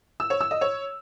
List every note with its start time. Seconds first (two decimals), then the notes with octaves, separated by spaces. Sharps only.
0.20 E6
0.30 C#5
0.41 E6
0.51 D#5
0.61 C#5